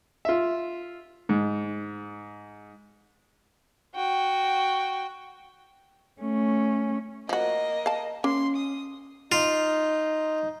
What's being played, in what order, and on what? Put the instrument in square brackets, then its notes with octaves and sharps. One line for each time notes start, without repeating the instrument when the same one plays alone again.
[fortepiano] F4 E5
G#2
[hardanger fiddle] F#4 G5
[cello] A3 C#4
[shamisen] F3 F#4 [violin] A#3 D#5
[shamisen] F5 A5
[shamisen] A#3 [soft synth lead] C#4 [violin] C6
[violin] D#6
[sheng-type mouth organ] D#4 [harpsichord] F4